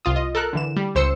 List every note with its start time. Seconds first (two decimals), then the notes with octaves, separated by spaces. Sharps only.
0.05 C2 F4 D#6
0.16 D#5
0.35 A4 A#4 F#6
0.53 D3 E3 E7
0.76 G3
0.95 C#2 C5 E6 C#7